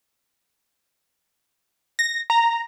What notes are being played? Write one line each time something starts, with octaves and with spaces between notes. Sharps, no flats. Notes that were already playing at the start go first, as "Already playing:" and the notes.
A#6
A#5